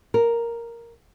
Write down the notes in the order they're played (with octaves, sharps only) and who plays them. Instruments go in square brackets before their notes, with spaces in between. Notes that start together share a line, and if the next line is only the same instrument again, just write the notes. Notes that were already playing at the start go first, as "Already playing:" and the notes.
[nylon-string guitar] A#4